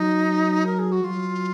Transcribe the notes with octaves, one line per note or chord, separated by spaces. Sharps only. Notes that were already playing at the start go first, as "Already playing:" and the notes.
Already playing: F#3 D#4
A#4
G#4
F#4
F#3 F4